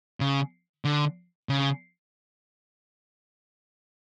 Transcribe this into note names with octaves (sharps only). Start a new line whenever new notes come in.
C#3
D3
C#3